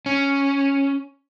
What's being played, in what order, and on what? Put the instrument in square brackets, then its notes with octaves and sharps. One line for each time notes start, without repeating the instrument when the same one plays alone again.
[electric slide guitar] C#4